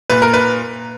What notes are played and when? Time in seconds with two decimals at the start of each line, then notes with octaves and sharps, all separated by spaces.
0.10 A#2 B4
0.22 A#4
0.34 B4